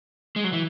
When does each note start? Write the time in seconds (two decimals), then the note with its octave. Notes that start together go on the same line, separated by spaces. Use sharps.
0.36 G#3
0.44 F#3
0.53 E3